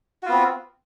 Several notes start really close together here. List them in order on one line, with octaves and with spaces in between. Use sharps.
F#4 F4 B3 C4